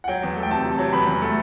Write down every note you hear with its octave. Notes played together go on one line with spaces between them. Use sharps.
F#5
F#3 G5
E2
A3
G5
C3 A5
C3
F#3
E2 B5
E2
A3